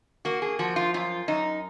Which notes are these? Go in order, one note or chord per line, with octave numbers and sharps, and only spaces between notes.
A#3 F#4
G#4
F3 F#4
F4
F#2 F4
F#2 D#4